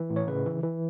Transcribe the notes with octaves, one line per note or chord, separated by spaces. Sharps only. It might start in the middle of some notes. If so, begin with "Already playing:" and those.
Already playing: E3
A2
C#5
C#3 B4
E3
E3